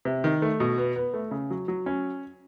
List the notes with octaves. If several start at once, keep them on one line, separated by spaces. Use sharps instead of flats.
C3
D#3
A3
B2
B3
B3
A3
C#3
F#3
F#3
C#4